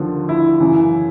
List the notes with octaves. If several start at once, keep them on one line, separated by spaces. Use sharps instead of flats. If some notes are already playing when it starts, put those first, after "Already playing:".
Already playing: D#2 D3 F3
E4
F#2 C#3 E3